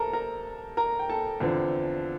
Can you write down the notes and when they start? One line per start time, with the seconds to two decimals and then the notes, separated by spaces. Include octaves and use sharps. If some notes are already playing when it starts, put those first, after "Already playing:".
Already playing: C3 A4 A#4 A5 A#5
0.13 A#4 A#5
0.77 A#4 A#5
0.99 G5
1.09 A4 A5
1.40 E2 D3 F3 C4